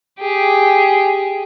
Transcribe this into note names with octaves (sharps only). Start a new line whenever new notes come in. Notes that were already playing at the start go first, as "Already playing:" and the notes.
G4 G#4